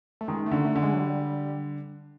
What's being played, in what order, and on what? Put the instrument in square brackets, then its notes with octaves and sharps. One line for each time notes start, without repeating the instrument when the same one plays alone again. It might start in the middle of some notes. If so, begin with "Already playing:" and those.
[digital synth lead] A3
[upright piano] D#3 [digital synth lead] G#3
[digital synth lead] A3
[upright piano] D3
[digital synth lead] A3
[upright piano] D3
[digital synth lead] G#3
F#3
G3